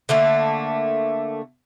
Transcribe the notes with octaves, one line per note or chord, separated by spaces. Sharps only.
D3 A3 A#3